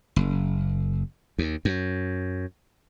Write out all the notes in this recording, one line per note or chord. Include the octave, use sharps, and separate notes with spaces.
F#1
D#2
F#2